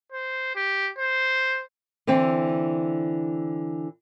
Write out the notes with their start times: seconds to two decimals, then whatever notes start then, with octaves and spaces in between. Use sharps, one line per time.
0.12 C5
0.56 G4
0.99 C5
2.07 D3 E3 C4